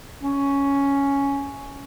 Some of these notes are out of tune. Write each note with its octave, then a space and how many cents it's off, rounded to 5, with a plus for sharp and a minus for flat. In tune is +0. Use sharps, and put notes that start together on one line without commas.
C#4 +5